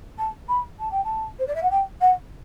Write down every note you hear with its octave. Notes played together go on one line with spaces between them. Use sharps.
A5
B5
A5
G5
A5
C5
D5
E5
F#5
G5
F#5